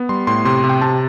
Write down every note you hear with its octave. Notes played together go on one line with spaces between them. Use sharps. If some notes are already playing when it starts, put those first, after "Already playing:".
Already playing: B3
G3 C6
A2 C6
C3 C6
C6
C3
G5
C3 A5